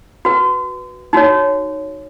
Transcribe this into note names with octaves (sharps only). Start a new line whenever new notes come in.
F#4 B4
D#4 F#4 C#5